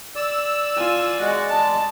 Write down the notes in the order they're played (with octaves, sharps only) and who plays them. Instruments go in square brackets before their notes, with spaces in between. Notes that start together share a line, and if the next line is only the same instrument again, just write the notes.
[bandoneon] D5 [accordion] E6
[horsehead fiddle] F4 G#5
[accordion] G#3 [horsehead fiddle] F#4
[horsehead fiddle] A5